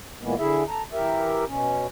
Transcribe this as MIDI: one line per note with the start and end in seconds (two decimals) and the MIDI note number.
0.22 0.35 46
0.22 0.35 52
0.22 0.35 56
0.22 0.35 58
0.22 0.35 59
0.38 0.64 50
0.38 0.64 64
0.38 0.64 68
0.38 0.64 76
0.68 0.83 69
0.68 0.83 82
0.92 1.45 52
0.92 1.45 67
0.92 1.45 70
0.92 1.45 76
1.47 1.87 47
1.47 1.87 61